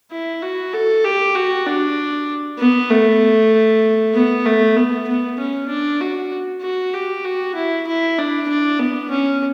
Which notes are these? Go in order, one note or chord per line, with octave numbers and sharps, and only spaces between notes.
E4
F#4
A4
G4
F#4
D4
B3
A3
B3
A3
B3
B3
C#4
D4
F#4
F#4
G4
F#4
E4
E4
D4
D4
B3
C#4